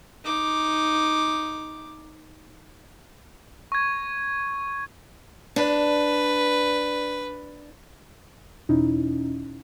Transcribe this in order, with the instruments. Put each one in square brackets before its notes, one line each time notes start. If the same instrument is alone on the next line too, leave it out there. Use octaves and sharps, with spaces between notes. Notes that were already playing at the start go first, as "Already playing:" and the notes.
[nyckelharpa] D#4 D6
[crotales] C#6 G#6
[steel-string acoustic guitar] D4 [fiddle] B4
[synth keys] E2 B2 C#4 D#4 E4